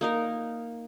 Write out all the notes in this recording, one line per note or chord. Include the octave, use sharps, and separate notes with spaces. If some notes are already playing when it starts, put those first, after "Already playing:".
A#3 D#4 A#4